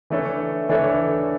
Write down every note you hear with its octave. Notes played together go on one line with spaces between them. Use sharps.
E3 A3 D4 A4 C#5
E3 A3 D4 A4 C#5